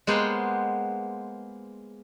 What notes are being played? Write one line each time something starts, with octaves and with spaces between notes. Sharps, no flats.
G#3 A#3 B3 C5 F#5 G5